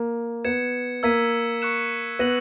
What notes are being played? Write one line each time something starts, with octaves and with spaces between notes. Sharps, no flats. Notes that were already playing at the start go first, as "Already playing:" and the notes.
Already playing: A#3
B3 G#6 C#7 E7
A#3 E6 G#6 B6 D#7
C#6 F#6 C#7 E7
B3 F#6 A#6 D#7 F#7